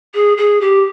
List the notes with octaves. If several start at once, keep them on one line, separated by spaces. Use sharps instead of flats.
G#4
G#4
G4